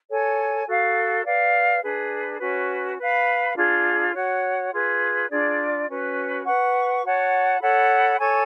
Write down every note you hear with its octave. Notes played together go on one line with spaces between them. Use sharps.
A4 C#5 G#5
F#4 A4 F5
B4 D5 F5
D4 G#4 B4
C#4 F#4 B4
B4 F5 B5
D4 F4 G#4
F#4 C#5 F#5
F4 G#4 B4
D4 F4 G#4 D5
C#4 F#4 B4
B4 F#5 C#6
F#4 C#5 F#5 A5
A4 C#5 F#5 B5
A4 C#5 G#5 C#6